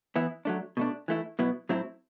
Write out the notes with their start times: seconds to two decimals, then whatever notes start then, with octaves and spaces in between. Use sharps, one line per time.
0.16 E3 B3 E4
0.45 F#3 A3 D4
0.77 B2 A3 D4
1.08 E3 A3 E4
1.39 B2 F#3 B3 E4
1.69 A2 F#3 C4 E4